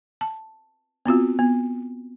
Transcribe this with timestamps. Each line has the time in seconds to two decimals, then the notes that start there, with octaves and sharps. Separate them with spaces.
0.21 A5
1.06 B3 C4 F4 F#4
1.39 B3